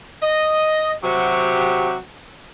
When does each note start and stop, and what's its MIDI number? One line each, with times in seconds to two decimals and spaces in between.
0.23 0.93 75
1.04 1.96 48
1.04 1.96 54
1.04 1.96 66
1.04 1.96 67